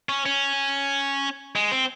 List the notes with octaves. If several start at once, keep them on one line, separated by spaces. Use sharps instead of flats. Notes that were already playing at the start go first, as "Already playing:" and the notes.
C#4
C#4
G#3
C4